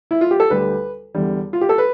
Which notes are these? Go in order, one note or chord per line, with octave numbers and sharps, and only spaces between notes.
E4
F4
G4
A4
D2 D3 G3 B4
E2 D3 G3
F4
G4
A4
B4